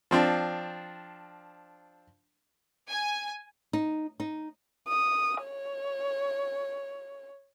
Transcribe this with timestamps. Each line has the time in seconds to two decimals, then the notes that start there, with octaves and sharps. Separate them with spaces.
0.11 F3 C4 D4
2.89 G#5
3.73 D#4
4.20 D#4
4.88 D#6
5.43 C#5